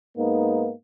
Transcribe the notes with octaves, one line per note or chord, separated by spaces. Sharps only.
G#2 A#3 B3 D#4